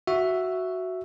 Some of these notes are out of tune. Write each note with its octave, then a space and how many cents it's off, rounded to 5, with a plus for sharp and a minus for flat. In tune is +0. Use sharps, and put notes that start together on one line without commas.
F#4 +0 E5 +5